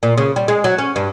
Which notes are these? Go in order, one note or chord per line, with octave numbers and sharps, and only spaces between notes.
A#2
C#3
G3
G#3
F#3
C#4
G2